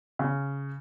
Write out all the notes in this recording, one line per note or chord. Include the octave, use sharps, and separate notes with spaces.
C#3